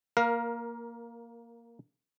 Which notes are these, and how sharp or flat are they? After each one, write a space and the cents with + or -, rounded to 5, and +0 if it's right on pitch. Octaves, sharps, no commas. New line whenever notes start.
A#3 +0 A#4 +20 F5 +0